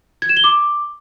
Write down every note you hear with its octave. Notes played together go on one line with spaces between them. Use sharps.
G#6
E7
G7
D6